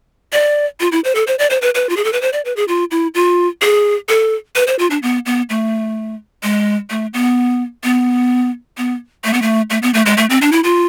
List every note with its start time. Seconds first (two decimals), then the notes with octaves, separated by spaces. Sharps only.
0.33 D5
0.80 F4
0.92 E4
1.04 C5
1.15 A4
1.27 C5
1.39 D5
1.50 C5
1.62 B4
1.75 B4
1.89 F4
1.97 G#4
2.04 A4
2.13 B4
2.22 C5
2.33 D5
2.45 B4
2.56 G#4
2.68 F4
2.91 E4
3.15 F4
3.62 G#4
4.09 A4
4.56 B4
4.67 C5
4.79 F4
4.90 D4
5.02 B3
5.26 B3
5.50 A3
6.43 G#3
6.90 A3
7.14 B3
7.84 B3
8.78 B3
9.24 A3
9.33 B3
9.42 A3
9.70 A3
9.83 B3
9.94 A3
10.06 G#3
10.18 A3
10.30 C4
10.42 D4
10.52 E4
10.64 F4